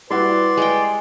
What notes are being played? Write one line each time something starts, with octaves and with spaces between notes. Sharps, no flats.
G3 E4 F#4 B4 D5 C6
G#3 G5